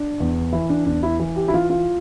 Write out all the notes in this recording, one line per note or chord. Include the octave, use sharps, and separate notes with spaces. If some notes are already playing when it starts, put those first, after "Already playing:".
Already playing: D4
E2
E3 E4
D4
E2 D4
E4
E3
G4
E4
E3 F4
F4